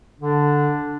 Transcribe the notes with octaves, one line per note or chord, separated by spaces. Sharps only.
D3 D4